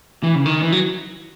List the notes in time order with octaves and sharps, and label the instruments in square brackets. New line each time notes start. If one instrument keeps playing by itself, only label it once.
[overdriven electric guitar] E3
C#3
D#3
E3
F#3